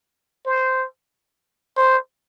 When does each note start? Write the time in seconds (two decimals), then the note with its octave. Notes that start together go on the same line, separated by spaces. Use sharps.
0.46 C5
1.77 C5